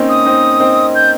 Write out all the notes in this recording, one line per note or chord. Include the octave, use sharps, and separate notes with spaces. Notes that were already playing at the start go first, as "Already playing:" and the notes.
Already playing: A#3 C4 C#4 D#4
D#6
C4 D#4
C4 D#4
G6